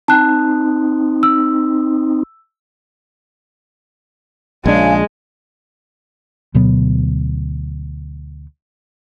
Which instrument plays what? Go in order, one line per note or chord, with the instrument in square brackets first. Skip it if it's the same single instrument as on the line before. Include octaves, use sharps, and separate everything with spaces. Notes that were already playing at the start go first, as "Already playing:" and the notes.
[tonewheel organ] C4 D#4 [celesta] A5 F#6
[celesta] E6
[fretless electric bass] A#1 D4 [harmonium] C#3 G#5 [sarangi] G#3
[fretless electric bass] D2 B2 F#3 B3